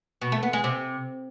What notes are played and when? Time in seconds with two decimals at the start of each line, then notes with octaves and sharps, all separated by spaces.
0.22 B2
0.32 A3
0.43 B3
0.53 G#3
0.64 C3